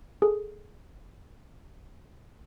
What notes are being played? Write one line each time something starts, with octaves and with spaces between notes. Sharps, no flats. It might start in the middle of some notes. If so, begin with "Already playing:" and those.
G#4 A4